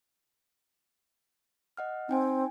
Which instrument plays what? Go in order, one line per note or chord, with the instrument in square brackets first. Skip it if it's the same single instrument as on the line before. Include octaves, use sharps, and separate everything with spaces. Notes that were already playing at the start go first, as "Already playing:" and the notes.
[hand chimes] D#5 F#5 F6
[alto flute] C4 [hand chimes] D#4 G5 G#5